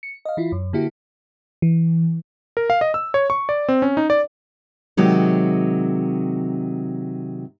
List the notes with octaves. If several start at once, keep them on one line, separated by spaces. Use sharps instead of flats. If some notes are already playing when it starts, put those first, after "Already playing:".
C#7
D#5 F5
E3 E4 F4
F#2
D3 A#3 E4 F#4 G4
E3
A#4
F5
D#5
E6
C#5
C#6
D5
C4
C#4
D#4
D5
C3 D#3 F#3 G#3